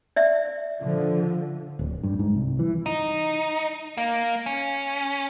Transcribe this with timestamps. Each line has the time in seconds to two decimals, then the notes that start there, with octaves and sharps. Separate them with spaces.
0.16 D5 E5
0.83 D3 F3
1.79 D1
2.03 G2
2.19 G#2
2.35 C2
2.59 E3
2.86 D#4
3.98 A#3
4.46 C#4